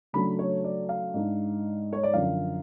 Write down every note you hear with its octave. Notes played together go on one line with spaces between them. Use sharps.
C#3 F#3 A3 D4 B5
C#5
D5
F5
G#2 G#3 D4
C#5
D5
F#2 D3 F3 F5